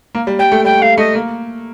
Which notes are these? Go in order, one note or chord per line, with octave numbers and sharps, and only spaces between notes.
A#3
G3
G3 G5
A3
G3 G5
A3 F5
A3 D#5
A#3